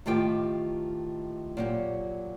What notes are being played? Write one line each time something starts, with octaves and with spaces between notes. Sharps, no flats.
A2 D#3 F4 G4 G5
A#2 F#3 G4